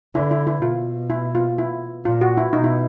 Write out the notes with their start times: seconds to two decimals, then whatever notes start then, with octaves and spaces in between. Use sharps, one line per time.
0.15 D3 E4
0.31 E4
0.47 E4
0.62 B2 F4
1.10 E4
1.35 F4
1.58 E4
2.05 A#2 F4
2.21 F#4
2.37 E4
2.53 B2 D#4
2.64 E4